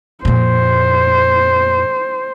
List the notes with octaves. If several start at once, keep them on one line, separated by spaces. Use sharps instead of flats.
F2 A#2 C5